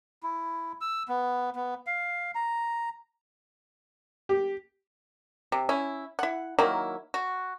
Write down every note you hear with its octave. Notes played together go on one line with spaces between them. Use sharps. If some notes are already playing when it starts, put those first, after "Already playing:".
E4
E6
B3
B3
F5
A#5
G4
C3
C#4 E4
E4 F#5
D#3 F#3 A#3 E4
F#4